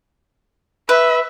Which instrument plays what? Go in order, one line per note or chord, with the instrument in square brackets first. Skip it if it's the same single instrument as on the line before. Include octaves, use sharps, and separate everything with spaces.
[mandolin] B4 [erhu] E5